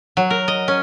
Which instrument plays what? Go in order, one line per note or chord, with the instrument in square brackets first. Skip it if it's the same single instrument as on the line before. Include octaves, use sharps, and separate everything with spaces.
[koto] F#3
A#4
D#5
C#4